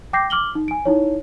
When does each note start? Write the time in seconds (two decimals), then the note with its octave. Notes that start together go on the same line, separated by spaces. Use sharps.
0.13 G5 D6 G6 A#6 C7
0.30 D6 F6 F#7 G7
0.55 D#4
0.68 G#5 D7
0.86 D#4 E4 C#5